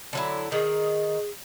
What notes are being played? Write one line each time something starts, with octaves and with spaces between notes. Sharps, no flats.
D3 F#3 E4
D#3 G#4